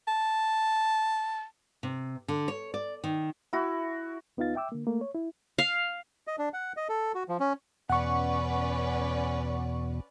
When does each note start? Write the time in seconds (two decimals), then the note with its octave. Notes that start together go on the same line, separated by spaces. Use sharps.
0.08 A5
1.83 C3
2.28 D3
2.48 C#5
2.74 D5
3.04 D#3
3.53 E4 F#4
4.37 D2 B3 D#4 F4 F5 A6
4.55 E5 G5 D6 E6
4.72 D3 A#3
4.87 A3 A#3
5.01 C#5
5.15 E4
5.58 F5
6.27 D#5
6.39 D4
6.53 F#5
6.77 D#5
6.89 A4
7.15 F#4
7.29 F3
7.40 C#4
7.90 E2 B2 C#4 B4 D5 F#5 C#6